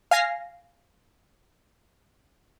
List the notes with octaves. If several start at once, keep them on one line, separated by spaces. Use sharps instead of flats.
F5 G#5 A#6 C7